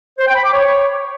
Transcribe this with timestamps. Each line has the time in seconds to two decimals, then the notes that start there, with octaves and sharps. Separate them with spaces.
0.18 C5
0.27 G5
0.36 B5
0.44 D6
0.53 C#5